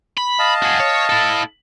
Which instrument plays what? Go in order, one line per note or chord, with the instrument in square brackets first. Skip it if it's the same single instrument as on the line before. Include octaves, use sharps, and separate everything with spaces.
[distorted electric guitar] B5
[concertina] D#5 F5 A5
[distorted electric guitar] F#4 G#4
C#5
E4 A4